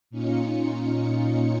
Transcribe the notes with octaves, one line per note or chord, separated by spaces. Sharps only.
A#2 C#4 D#4 F4 C#7